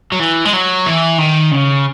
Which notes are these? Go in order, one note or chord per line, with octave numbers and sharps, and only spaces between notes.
F#3
E3
G#3
F#3
E3
D#3
C#3